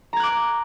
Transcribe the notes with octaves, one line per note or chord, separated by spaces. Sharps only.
A#5 D6 F#6 G#6